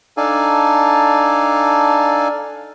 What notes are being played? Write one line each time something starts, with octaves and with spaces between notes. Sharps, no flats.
D4 D#4 A4 D5 F5 G#5